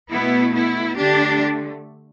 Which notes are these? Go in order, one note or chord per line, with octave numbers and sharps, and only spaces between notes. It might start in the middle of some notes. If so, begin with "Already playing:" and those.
B2 A3 B3 E4
B3 E4
D3 A3 D4 G4